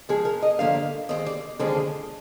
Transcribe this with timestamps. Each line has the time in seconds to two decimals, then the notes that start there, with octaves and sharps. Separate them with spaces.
0.09 G#2 F3 G#3 G#4
0.25 A#4
0.42 D#5
0.59 G2 D3 F3 A#3 F5
1.09 D#2 D#3 G#3 C4 D#5
1.26 D5
1.59 D#2 D3 F3 G#3 C4 G#4